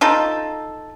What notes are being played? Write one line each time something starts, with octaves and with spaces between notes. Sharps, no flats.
D#4 F4 A4